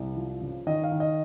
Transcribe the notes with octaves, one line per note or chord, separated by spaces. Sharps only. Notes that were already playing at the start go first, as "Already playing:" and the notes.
Already playing: C2
F3
C#3
D#3 D#5
F5
D#3
D#5